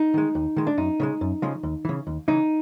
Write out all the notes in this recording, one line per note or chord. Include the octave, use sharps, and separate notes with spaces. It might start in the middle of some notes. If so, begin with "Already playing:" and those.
Already playing: D#4
D#3 G#3
D#2
D#3 G#3
D4
F#2 D#4
C#3 F3 G#3
F#2
C#3 F3 G#3
D#2
C#3 E3
D#2
C#3 E3 D#4